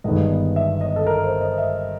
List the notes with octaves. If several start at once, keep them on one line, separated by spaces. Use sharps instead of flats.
G1 G2 D#3 G#3 B3 D#5
E5
D#5
A4
A#4
C5
D#5
E5